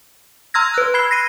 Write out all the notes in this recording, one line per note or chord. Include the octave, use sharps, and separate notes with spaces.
A#5 C6 E6 F6 G#6 A#6
B4 F#6
B5 G#6 C7 G7
A#6 C7 D#7